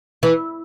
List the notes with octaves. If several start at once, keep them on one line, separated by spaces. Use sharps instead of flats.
E3